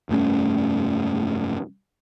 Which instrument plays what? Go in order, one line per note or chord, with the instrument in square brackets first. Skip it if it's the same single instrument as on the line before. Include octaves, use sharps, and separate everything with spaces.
[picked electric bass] F1 G2 A3 C#4